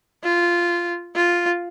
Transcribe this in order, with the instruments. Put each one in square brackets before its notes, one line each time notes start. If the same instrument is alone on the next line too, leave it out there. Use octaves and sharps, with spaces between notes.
[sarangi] F4
F4